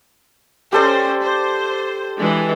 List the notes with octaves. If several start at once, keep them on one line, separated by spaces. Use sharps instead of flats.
C#4 G4 A4 C5 D5
C5
E3 G#3 D4